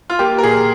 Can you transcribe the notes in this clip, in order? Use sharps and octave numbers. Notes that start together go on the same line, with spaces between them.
F4
A#3 G4
A#4
A#2 G#4